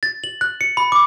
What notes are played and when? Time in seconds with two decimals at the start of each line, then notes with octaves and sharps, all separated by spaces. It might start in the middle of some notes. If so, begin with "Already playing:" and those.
0.03 A6
0.24 F#7
0.41 F#6
0.61 C#7
0.77 B5
0.92 D6